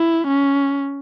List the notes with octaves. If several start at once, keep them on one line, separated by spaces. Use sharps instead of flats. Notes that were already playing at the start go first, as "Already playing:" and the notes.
Already playing: E4
C#4